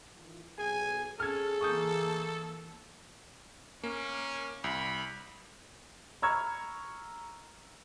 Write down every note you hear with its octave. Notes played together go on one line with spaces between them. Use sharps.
D#3 E3 F4
B1 G#4 G#5
C#4 G#4 A4 F6 G#6
E3 A#3 C#6 D#6 G6
A#3 C#4
C2 B5
A#5 B5 C#6 E6 F6 G#6